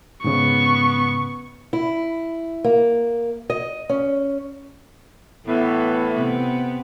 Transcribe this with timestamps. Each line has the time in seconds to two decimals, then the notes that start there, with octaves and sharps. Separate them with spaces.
0.24 G#2 C#3 B3 C#6
1.73 E4
2.64 A#3
3.50 D#5
3.89 C#4
5.46 A2 E3 B3
6.14 C3 B3